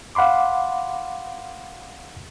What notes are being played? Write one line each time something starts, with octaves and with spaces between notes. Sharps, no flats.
F5 F#5 B5 C6 D6